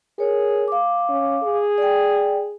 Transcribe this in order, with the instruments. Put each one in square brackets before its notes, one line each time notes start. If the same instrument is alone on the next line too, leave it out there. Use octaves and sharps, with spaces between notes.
[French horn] G#4 [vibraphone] A#4 C#5
[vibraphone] F5 D6
[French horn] C#4
G#4
[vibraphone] D5 G5